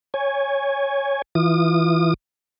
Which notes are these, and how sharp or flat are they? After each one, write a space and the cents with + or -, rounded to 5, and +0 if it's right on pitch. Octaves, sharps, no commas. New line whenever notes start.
C#5 +0 G#5 -10
E3 +0 F4 +0 D#6 -30